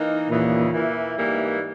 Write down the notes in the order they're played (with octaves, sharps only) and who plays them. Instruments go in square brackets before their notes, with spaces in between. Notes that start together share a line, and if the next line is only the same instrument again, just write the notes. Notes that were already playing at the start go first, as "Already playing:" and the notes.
Already playing: [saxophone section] E3 A#3 D#4 A#4
[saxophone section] D#2 C#3 E3 [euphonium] A#2
[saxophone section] E3 A#3 E4
G#2 E3 G3 A#3